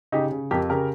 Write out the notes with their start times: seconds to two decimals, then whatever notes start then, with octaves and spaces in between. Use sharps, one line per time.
0.12 C#3 D#4 G4
0.32 C#3
0.51 F2 G4 A#4
0.70 C#3 G4 A#4